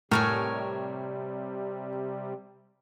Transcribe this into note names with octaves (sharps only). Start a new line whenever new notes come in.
A2 C3 G3 A#4 C#5 G#5